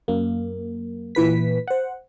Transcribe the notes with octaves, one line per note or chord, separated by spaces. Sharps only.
F#2 A#3
A#2 E3 B4 B6
C5 F#5